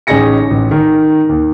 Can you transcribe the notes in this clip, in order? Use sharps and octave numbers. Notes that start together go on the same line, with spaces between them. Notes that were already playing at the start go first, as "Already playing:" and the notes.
A1 C#4 D#4 G#4 A#6 C#7
A1
D#3
D#2